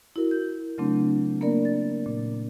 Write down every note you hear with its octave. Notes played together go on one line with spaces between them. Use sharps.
E4 F#4 A#4
G6
C#3 F#3 A3 C4 D4
A#3 B3 D4 A#4 D5
A6
A#2